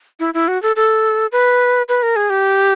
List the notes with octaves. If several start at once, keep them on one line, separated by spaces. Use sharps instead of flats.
E4
E4
F#4
A4
A4
B4
B4
A#4
G#4
G4